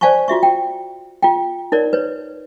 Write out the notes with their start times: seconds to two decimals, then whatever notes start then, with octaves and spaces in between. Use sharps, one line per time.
0.01 C5 D5 F5 G#5 A5 C#6
0.28 F4 F#4 E5 C#6
0.43 G5
1.23 F4 G5
1.72 D#4 A#4 C#5 D5
1.93 B4 C#5